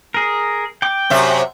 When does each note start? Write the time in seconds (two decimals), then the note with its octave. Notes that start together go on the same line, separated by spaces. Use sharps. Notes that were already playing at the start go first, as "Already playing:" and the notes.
0.14 G#4 A#4
0.82 G5 D6
1.10 F#2 C3 E5